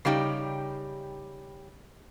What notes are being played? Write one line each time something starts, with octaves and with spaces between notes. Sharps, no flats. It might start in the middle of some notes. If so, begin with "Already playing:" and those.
C#3 G3 D#4 G4